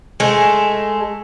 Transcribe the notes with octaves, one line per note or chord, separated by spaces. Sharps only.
G#3 A3